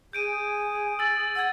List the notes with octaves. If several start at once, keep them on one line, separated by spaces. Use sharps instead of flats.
G#4 G6 D7 D#7
E6 A6 F#7
F#5 E6 G#6